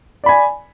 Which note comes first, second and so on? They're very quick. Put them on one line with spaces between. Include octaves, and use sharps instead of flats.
D5 B5 G#5